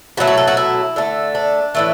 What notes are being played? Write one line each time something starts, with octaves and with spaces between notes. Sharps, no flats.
B2 F#3 A3 F#4
F#4
A4
F#4
E4
D3 A3
D4
A2 E3 A3